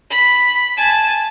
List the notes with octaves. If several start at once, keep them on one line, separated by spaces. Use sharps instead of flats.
B5
G#5 A5